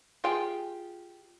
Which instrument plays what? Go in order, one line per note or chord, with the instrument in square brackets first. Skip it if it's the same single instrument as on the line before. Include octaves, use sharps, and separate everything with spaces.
[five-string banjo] F4 G4 G#4 G5